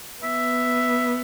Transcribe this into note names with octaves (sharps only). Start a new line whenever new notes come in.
B3 E5